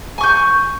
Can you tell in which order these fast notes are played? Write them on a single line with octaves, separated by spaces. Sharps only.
G#5 C#6 G6